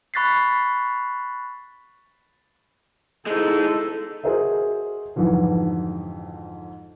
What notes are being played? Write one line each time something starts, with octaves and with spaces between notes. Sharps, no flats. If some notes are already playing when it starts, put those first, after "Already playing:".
B5 C#6 F#6 A6 B6 C7
G#3 D#4 E4 A4
F#4 G#4 A#4 C5 D#5 E5
F2 G#2 D3 E3 F#3